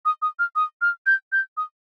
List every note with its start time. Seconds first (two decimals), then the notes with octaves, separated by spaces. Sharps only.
0.05 D#6
0.22 D#6
0.39 F6
0.56 D#6
0.82 F6
1.06 G6
1.32 G6
1.57 D#6